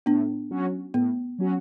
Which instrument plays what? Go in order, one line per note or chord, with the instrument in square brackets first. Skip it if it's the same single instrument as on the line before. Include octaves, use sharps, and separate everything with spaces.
[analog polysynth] A2 [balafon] B3 D4
[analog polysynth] F#3 C#4 F#4
[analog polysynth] A2 [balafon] B3
[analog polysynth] F#3 C#4 F#4